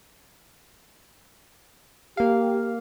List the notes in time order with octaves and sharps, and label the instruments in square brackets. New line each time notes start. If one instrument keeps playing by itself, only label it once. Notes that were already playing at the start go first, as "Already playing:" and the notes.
[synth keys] A#3 F5 [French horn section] G4